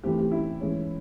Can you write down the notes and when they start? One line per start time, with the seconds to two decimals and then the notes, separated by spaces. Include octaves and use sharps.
0.03 E3 A3 C4 G4
0.18 G4
0.31 E4
0.60 E3 G#3 C#4